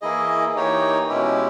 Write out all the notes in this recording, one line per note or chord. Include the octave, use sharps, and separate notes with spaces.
E3 A#3 E4 G#4 D#5
E3 A#3 D#4 G4 C#5
B2 G#3 C#4 E4 G4